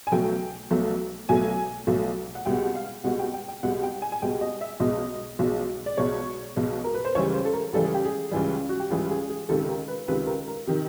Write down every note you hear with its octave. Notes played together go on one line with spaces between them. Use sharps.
G#5
B1 B2 F#3 A3 G5
B1 B2 F#3 A3
B1 B2 F#3 A3 G#5
B1 B2 F#3 A3
F#5
C2 B2 G#3 G5
F5
C2 B2 G#3 F#5
G5
G5
G5
C2 B2 G#3 F#5
G5
G#5
G#5
C2 B2 G#3 G5
D#5
E5
B1 B2 G#3 D#5
B1 B2 G#3
D5
B1 B2 G#3 C#5
B1 B2 G#3
A#4
B4
C5
C#2 C#3 E3 G3 C#5
C5
A4
A#4
C#2 C#3 E3 G3 A4
G#4
G4
G#4
C#2 C#3 E3 G3
F#4
G4
C#2 C#3 E3 G3 G#4
G#4
G#4
C#2 C3 D#3 A4
A#4
B4
C#2 C3 D#3 B4
A#4
A#4
C3 D#3